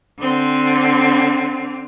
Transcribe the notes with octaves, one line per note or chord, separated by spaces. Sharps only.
D3 C4